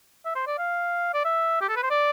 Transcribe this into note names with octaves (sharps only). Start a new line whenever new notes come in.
E5
C5
D5
F5
D5
E5
G4
A4
B4
C5
D5